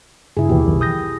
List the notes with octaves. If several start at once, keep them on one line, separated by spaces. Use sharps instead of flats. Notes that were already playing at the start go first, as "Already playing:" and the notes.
G2 C#3 E4 G#4
D#2 B2 E3 G4
B1 F2 D#3
D#6 G6 A#6